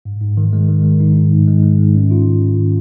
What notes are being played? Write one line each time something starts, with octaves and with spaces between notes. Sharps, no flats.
G#2
G#2
D#3
G#3
D#3
G#3
D#4
G#2
G#2
G#3
G#3
G#2
C#4
F4
D#3
C#4
D#3